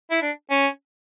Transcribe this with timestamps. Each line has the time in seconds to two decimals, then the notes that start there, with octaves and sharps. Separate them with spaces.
0.11 E4
0.22 D4
0.51 C#4